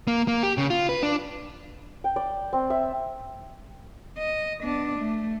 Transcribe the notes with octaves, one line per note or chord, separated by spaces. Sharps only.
A#3
A#3
G4
C#3
F4
B4
D4
G5
D5
C4
E5
D#5
B3 D4
A3